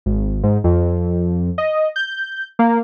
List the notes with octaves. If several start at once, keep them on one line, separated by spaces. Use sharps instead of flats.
G#1
G#2
F2
D#5
G6
A#3